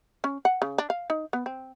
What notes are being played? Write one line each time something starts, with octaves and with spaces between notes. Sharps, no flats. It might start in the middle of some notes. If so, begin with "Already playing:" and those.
C#4
F#5
C#3
D4
F5
D#4
B3
C4